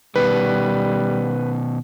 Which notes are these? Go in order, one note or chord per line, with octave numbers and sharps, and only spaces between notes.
B2 D#3 G3 B4